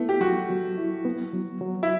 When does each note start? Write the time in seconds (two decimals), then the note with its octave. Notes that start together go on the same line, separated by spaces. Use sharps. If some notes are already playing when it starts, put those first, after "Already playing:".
Already playing: A3 B3 E4
0.09 G4
0.21 F#3 F#4
0.50 F#3
0.78 E4
1.05 B3
1.33 F#3
1.61 F#3
1.83 E4